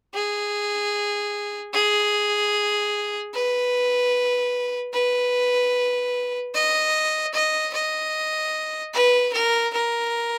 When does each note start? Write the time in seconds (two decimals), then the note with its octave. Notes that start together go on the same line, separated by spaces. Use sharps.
0.14 G#4
1.74 G#4
3.34 B4
4.94 B4
6.54 D#5
7.34 D#5
7.73 D#5
8.94 B4
9.33 A#4
9.74 A#4